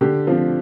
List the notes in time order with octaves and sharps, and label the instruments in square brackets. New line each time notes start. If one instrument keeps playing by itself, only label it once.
[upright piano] D3 G4
F3 C4